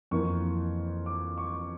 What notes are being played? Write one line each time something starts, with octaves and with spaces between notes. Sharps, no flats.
F2 E3 A#3 C#6
D6
C#6